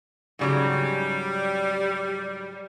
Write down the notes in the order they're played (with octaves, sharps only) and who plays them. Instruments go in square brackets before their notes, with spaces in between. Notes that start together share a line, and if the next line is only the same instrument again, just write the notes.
[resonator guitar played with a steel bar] G#2 C#3 F#3 [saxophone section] G3